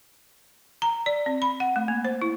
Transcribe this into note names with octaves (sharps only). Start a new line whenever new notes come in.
A#5
D5
C4
B5
F#5
A3
A#3
C5
E4